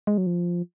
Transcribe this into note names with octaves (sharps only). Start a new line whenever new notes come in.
G#3
F#3
F3